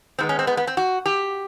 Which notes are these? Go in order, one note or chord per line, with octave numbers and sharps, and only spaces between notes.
D#3 G#3 B3 C4
C#4
C4
B3
B3
C4
F#4
G4